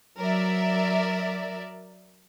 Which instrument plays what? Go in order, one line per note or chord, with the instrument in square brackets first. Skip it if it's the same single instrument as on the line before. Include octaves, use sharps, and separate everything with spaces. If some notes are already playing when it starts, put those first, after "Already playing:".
[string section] F#3 A#4 D5 E5